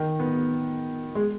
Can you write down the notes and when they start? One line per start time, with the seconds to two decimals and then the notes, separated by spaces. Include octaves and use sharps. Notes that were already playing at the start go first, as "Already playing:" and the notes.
Already playing: D#3
0.20 B3
1.15 G#3